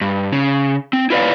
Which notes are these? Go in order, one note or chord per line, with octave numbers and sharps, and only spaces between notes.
G2
C#3
C4
E4 F4 B4 C#5 D5 F5